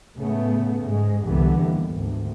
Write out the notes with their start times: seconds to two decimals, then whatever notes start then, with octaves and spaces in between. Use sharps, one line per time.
0.16 A2 C#3 A3 B3
0.80 G#2 G#3
1.25 C2 G2 D3 E3 G3 B3
1.62 D#2
1.93 G#1 D2